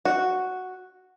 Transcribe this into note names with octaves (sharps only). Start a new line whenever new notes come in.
F#4